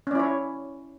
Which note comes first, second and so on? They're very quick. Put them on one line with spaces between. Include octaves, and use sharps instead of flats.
C#4 D5 E4 C#5